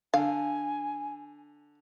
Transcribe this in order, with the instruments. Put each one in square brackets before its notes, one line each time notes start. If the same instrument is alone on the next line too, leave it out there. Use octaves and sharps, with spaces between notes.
[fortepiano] D3 [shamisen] F5 [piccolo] G#5